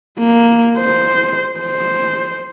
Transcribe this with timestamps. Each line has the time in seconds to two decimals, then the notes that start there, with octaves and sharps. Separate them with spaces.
0.19 A#3
0.79 C5
1.60 C5